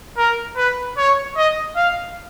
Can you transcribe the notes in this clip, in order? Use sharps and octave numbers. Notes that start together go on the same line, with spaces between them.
A#4
B4
C#5
D#5
F5